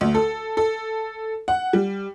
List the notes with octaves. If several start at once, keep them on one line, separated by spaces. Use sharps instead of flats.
D2
A4
A4
F#5
G3